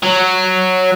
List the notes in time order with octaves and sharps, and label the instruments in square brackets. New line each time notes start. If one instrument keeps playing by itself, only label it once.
[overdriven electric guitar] F#3